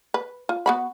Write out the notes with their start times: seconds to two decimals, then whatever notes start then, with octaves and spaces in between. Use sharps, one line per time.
0.14 B4
0.49 F4
0.66 B3 F#4 B5